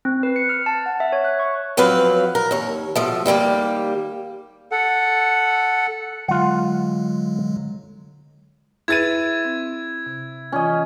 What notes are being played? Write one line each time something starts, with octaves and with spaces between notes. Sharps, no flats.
C4
B4
C#7
F6
A5
F#5
E5
C#5
F#6
C#6
F3 F#3 C4 B4 F5
A#4
D#2 C#5
B2 F3 A3
D#2 G3 A#3 G4
A4 F#5
D3 F#3 G#3 F4 F#5
E4 G#4 B4 G#6 A6 D#7
C4
C3
E3 C#4 F4 D#5